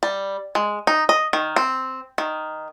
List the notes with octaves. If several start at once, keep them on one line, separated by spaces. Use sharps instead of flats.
G3
G#3
D#4
D#5
D#3
C4
D#3